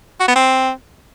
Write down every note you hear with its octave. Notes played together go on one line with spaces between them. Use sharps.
F#4
B3
C4